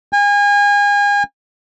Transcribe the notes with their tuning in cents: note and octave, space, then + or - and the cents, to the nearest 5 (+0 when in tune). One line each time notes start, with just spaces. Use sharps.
G#5 -35